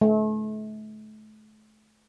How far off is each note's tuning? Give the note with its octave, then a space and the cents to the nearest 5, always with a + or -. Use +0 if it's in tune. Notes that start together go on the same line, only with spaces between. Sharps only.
A3 -35